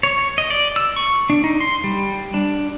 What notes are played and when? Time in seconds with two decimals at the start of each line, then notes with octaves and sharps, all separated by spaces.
0.03 C#5
0.38 D#5
0.50 D5
0.76 E6
0.96 C#6
1.30 D4
1.44 D#4
1.60 C6
1.84 G3
2.34 D4